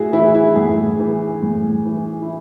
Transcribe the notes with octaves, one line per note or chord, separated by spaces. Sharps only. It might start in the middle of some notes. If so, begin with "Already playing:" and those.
Already playing: A2 E4 F#4 G#4
E3 E4
E4
A2 G#4
E3
A2
E3
E4